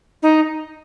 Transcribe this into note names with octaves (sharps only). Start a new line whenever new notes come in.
D#4